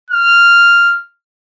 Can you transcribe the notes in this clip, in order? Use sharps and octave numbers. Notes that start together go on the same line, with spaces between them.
F6